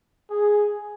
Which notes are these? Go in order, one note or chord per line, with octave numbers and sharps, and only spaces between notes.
G#4